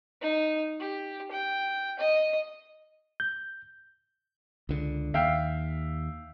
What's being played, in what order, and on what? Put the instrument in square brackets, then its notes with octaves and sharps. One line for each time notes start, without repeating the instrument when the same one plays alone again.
[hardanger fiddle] D#4
G4
G5
D#5
[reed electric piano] G6
[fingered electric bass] C#2 D3
[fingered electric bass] D#2 [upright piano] E5 F5 G5